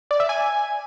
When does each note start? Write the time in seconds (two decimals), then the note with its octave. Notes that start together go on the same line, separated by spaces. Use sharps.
0.11 D5
0.20 E5
0.29 G#5